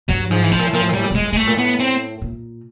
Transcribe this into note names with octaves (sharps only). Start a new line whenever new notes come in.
G2 F#3
G#2 F3
E3
A2 F3
A#2
A2
A#2 F3
A2
A#2
A2 G3
A#2
A2
A#2 G#3
A2
A#2 G#3
A2 A3
A#2
A2 B3
C4
A#2